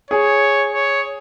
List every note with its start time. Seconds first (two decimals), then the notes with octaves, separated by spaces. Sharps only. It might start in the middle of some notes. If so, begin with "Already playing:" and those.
0.11 G#4 C#5
0.74 C#5